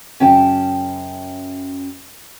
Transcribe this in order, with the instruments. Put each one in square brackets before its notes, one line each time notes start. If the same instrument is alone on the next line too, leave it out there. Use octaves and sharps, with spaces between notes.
[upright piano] F#2 C#3 [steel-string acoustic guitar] C#4 G5 A5